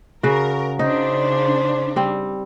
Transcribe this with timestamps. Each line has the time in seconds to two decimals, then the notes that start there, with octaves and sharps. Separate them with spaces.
0.23 C#3 F#4 A#4
0.79 C#3 D4 D#4 C5
1.96 G3 C4